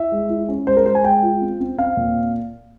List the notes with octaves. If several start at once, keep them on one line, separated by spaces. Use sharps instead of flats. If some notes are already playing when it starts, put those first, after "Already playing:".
Already playing: E4 E5
G#3
E4
C#4
G#3 C5
A#4
G#3 C5
G#5
G#3 G5
F4
C4
C4
C4 F5
A#2